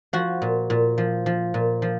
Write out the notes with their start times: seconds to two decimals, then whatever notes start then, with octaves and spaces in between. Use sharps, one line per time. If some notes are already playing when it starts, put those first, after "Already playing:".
0.13 F3 F#4
0.42 A#2
0.70 A#2
0.98 F3
1.26 F3
1.54 A#2
1.82 F3